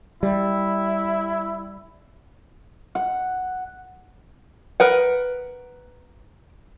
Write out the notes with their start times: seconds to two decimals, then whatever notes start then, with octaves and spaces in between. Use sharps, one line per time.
0.23 G3 E4
2.95 F#5
4.80 A#4 B4 F#5